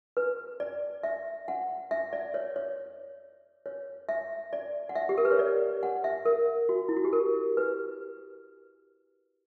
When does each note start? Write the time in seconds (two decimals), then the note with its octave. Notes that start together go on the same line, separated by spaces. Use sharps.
0.17 B4
0.60 D5
1.03 E5
1.48 F#5
1.91 E5
2.13 D5
2.34 C#5
2.56 C#5
3.66 C#5
4.09 E5
4.53 D5
4.89 F#5
4.95 E5
5.09 G4
5.18 A#4
5.25 B4
5.32 C#5
5.39 D5
5.83 F#5
6.04 E5
6.25 A#4
6.69 F#4
6.89 E4
6.97 F#4
7.05 G4
7.13 A#4
7.57 B4